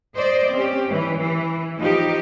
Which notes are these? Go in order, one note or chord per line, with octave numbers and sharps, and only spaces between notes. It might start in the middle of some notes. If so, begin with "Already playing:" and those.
C5 D5 D#5
C4 C#4 G4
E3
E3
F3 D#4 G4